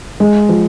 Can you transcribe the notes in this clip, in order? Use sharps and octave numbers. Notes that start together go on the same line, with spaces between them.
G#3
F3